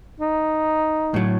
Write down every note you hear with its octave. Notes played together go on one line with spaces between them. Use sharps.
D#4
A2 F#3